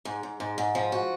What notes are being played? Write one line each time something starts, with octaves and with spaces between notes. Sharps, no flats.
G#2
G#2
G#2
G#2
F3
F#4